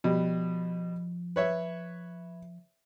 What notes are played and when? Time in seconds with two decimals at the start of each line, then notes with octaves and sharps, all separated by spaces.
0.04 B2 F3 G3
1.36 B4 C#5 E5